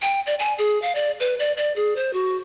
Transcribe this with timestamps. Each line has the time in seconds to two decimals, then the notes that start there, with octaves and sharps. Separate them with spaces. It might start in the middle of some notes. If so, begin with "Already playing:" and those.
0.02 G5
0.26 D5
0.39 G#5
0.58 G#4
0.82 F5
0.95 D5
1.20 B4
1.39 D5
1.57 D5
1.76 G#4
1.96 C5
2.13 F#4